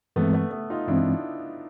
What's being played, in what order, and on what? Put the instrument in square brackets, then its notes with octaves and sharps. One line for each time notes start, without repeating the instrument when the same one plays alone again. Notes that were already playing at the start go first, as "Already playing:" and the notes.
[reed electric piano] G2 E3 G#3 C4 [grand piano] A3 B3
[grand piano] A3 B3
A3 B3
D#4 F4
[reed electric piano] G2 E3 G#3 C4 [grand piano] D4 E4